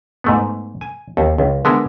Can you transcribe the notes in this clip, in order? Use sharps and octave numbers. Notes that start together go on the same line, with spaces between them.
G#2 A3 B3
G#5
D#2
C#2
D3 G#3 B3 A#4 E5